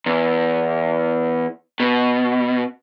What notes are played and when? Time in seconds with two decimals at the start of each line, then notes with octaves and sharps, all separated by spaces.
0.06 E2
1.80 B2